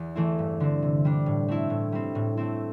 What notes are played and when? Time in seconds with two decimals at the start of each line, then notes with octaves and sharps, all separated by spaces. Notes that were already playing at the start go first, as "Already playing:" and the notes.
Already playing: E2
0.15 E3 A3 C4 E4
0.39 G2
0.60 D3 C4
0.82 C3
1.05 G3 D4
1.26 A2
1.48 A3 C4 E4
1.70 A2
1.92 G3 C4
2.15 A2
2.37 A3 C4 E4